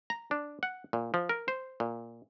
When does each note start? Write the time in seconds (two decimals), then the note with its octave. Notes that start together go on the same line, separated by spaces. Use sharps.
0.10 A#5
0.31 D4
0.63 F#5
0.93 A#2
1.14 F3
1.29 A#4
1.48 C5
1.80 A#2